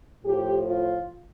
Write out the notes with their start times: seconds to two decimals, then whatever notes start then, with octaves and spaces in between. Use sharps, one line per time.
0.24 A2 F3 G4
0.69 F4